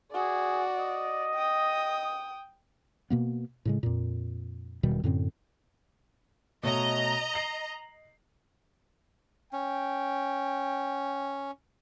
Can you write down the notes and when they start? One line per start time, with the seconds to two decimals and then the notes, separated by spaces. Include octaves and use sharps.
0.12 F#4 G#4 D5
0.76 D#5
1.34 G5 D#6
3.10 B2 A#3 B3
3.65 A2 C#3 G#3
3.83 F2 A#2
4.83 E1 B2 D#3 G3
5.04 F#2 A2 D3 C4
6.63 B2 A3 C#5 D#5 A#5
7.34 C7 F#7
9.53 C#4 G5